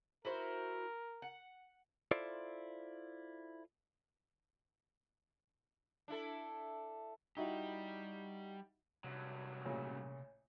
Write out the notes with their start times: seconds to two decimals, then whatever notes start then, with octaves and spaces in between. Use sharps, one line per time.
0.25 E4 F#4 A#4 C5
1.22 F#5
2.11 E4 F4 A4 C5 D5
6.08 D4 E4 A4
7.37 G3 D#4 E4 F#4 G4
9.04 G2 C3 F#3
9.65 A1 A#2 C#3 C#5